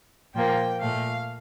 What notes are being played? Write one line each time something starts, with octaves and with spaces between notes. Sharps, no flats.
A#2 F3 A#3 G5
A#2 A3 F5